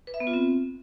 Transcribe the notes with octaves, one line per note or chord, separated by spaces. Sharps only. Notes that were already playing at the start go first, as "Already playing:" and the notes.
B4
E5
B3
F4
C4